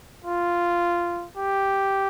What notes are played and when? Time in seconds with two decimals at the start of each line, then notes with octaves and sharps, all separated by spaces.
0.25 F4
1.38 G4